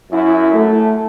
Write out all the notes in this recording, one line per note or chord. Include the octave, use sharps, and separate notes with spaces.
F#2 E4
A3